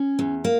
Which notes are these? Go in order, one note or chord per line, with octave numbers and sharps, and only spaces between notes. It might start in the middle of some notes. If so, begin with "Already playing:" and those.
Already playing: C#4
E2
A#3